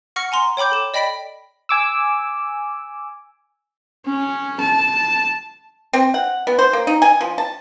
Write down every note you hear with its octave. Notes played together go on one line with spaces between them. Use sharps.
F#5 C#6 F6 A#6 C#7
G#5 A#5 C6
C#5 G5 B5 D6 G6
A4 E7
D5 D#5 G5 B5 B6 D7
G#5 D6 E6
C#4
A5
C4
F#5
B3
C5
A#3
D#4
G#5
F3
A5